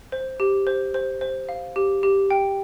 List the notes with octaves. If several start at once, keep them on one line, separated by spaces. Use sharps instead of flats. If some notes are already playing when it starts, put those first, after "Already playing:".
C5
G4
C5
C5
C5
F5
G4
G4
G5